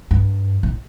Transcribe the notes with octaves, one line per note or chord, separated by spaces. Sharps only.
G2
A2